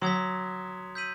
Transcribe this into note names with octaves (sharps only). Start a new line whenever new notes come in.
F#3 C6 D#6 G#6 B6
E6 G6 B6 D#7 F#7